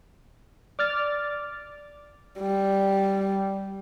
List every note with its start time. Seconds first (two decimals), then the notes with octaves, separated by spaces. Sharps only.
0.79 D5 D6 F6 A6
2.40 G3